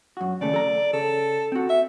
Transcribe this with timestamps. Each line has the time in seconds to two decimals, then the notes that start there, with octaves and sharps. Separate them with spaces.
0.17 F#2 F#4
0.41 D#2 C#3 A3 D5
0.54 A4 A#5
0.93 C#3 A4
1.52 C4 F#4
1.70 E5